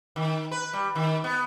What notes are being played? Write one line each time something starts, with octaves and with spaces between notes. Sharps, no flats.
D#3
B4
G3
D#3
B3